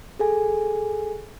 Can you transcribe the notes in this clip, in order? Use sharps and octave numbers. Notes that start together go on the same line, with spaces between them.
G#4 A4 G#5